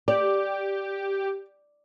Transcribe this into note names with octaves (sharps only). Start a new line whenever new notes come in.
G4 D5